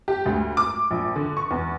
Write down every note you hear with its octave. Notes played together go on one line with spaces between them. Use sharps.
G4
D2
D6
A#1
D3
C#6
E2